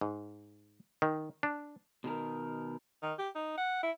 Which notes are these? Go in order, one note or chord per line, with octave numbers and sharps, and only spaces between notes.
G#2
D#3
D4
B2 D#3 A#4
D#3
G4
D#4
F#5
E4